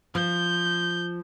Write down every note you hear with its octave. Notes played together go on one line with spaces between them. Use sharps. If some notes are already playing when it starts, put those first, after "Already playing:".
F3 G6